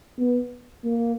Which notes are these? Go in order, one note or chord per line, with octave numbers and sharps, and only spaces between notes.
B3
A#3